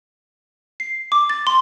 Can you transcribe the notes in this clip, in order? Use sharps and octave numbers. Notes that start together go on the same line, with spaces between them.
C7
D6
A6
C6